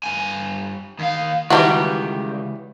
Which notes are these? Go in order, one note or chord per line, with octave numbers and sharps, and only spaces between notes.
G2 G#5
D#2 F5
C#2 D#3 E3 F#3 G3 F#4 G4